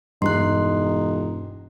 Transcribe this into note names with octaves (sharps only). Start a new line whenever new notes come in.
E1 G2 D#4 C6 F#6